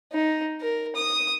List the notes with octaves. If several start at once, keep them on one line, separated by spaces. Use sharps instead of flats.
D#4
A#4
D#6